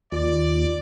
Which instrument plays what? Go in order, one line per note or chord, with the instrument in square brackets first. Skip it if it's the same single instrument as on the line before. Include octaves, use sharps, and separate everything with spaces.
[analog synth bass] D#2 [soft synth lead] F4 [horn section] D5